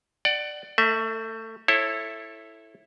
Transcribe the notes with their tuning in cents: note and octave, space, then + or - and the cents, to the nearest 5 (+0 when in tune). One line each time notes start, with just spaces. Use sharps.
D5 +15 F#5 +30
A3 +25 E5 -25
E4 +0 A4 +0 C#5 -25